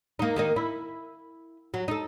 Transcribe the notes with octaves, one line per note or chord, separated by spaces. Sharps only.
A#3 D#4
D#3 A#3 D#4
E4
F#3
D#4 A4